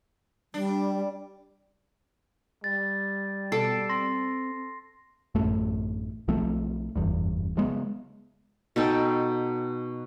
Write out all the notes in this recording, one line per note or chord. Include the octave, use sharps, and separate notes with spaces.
G3 D4
G3 A6
B2 A4 D6 C7
C4 C6 A#6
A1 F#2 A3
B1 F3 A3 C4
F#1 E2 G2
C#3 F#3 G#3 B3
B2 D#4 A4 G5